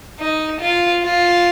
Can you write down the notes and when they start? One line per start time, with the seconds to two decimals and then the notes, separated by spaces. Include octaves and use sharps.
0.19 D#4
0.60 F4
1.03 F4